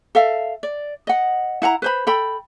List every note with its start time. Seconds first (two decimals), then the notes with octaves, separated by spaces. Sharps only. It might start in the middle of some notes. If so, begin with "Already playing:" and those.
0.15 A4 E5 F5
0.63 D5
1.07 D#5 F#5
1.62 E4 F#5 G#5 A#5
1.82 B4 C5 B5
2.07 A4 G5 B5